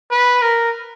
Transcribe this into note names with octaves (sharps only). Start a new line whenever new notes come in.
B4
A#4